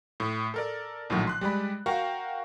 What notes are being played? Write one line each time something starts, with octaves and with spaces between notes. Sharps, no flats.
A2
A4 A#4 D5
A#1 A2 D#3 F#3
C6 F#6
G3 G#3 D5 B5
F#4 A#4 F5 G5 C#6